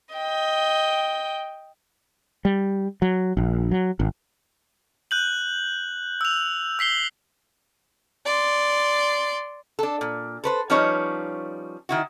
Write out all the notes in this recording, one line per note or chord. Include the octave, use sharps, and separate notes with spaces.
D#5 G5
G3
F#3
A#1
F#3
G#1
F#6 G6 F#7
E6 F7
E6 B6 C7 G7
D5 C6
D4 A4
A#2
A4 B4 C5
F3 G3 C#4 D#4 B4 C#5
D#3 E4 F#4